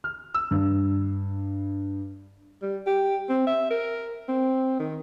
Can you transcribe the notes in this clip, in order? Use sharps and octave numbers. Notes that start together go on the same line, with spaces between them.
F6
E6
G2
G3
G4
C4
E5
A#4
C4
D#3